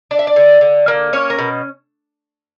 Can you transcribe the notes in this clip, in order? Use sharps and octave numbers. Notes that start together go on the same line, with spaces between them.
D4 D5
E5
D5
D3
D3
A#3
C#4 C#5
A#4
B2